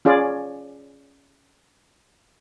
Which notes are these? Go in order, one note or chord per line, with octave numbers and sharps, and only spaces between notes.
C#4 F4 G#4 D5